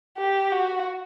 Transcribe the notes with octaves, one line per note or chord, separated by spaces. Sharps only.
G4
F#4